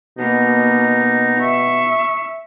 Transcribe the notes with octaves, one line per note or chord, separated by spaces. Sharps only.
B2 A#3 D#4
E5 C#6